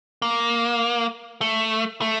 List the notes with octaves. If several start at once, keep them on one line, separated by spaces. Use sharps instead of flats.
A#3
A3
A3